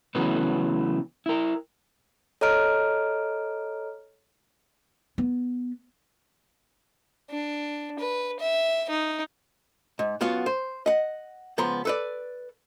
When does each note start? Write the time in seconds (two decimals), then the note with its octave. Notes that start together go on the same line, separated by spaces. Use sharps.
0.15 C#3 E3 F#3 A3 B3
1.26 E4 A#4
2.41 A4 C#5 D#5 A#5 F6 D7
5.18 B3
7.30 D4
7.99 B4
8.40 E5
8.90 D#4
9.99 G#2
10.21 F#2 B3 F4 F#4
10.46 C5
10.86 D#5 F#5
11.58 C#2 F3 B3 A#5 C6
11.85 A4 B4 D5